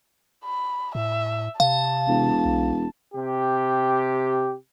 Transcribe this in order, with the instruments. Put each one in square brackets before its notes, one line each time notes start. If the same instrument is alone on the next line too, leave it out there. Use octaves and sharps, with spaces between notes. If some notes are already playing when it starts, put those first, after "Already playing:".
[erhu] B5
[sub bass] A2 [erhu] E5
[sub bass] C3 [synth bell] F5 [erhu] A5
[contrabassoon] E1
[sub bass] B1
[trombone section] C3 G4